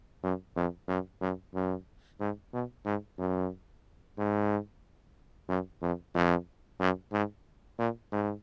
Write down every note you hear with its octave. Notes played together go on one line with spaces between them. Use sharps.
F#2
F2
F#2
F#2
F#2
G#2
B2
G#2
F#2
G#2
F#2
F2
F2
F#2
G#2
A#2
G#2